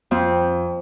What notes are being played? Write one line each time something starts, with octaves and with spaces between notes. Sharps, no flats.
F2 C4